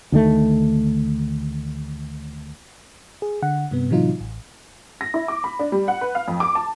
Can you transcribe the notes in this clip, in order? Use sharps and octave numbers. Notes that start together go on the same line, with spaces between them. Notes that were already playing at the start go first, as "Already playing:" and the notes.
D2 D#3 A3
G#4
D3 F#5
G2 C3 B3
A2 C3 E3 F#3 D#4 F4
A1
A#6
E4
D6
B5
D4
G3
F#5
B4
F5
F2
D6
A5